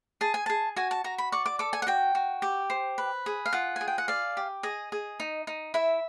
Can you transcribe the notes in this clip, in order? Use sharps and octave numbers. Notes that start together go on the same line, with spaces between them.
G#4 A5
G#5
G#4 A5
F#4 G#5
A5
F#4 A#5
B5
D5 C#6
D6
A4 D6
G#5
F#5
F#4 G5
F#4
G4
C5
B4
G#4
F5
F4 F#5
G#4 G#5
G5
F#5
D5 F5
G4
G#4 D#5
G#4
D#4
D#4
E4 E5